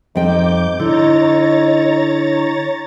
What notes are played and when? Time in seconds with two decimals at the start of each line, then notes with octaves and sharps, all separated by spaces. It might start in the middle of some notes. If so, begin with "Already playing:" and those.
0.16 F2 D#4 G5 D6 G6
0.80 D3 D#4 E4 C#5 A#5 A6